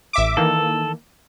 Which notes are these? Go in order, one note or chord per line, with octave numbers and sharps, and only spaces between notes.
A1 E5 D6
D#3 E3 A#3 A4